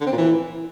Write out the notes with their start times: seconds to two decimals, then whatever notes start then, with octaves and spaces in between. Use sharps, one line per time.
0.01 D3
0.06 C4
0.12 A#2
0.18 E3